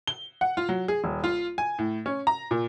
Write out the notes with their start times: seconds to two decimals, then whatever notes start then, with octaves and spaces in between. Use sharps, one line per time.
0.07 G7
0.41 F#5
0.57 F4
0.69 F#3
0.88 G#4
1.04 D#1
1.24 F4
1.58 G#5
1.79 A2
2.06 C#4
2.27 A#5
2.51 A#2